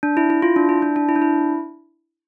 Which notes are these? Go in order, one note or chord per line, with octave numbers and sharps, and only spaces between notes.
D4
E4
E4
F4
D4
E4
D4
D4
E4
D4
E4